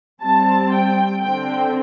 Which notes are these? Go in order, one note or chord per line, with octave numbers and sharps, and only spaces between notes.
G3 C4 A5
G5
D3 C4 G5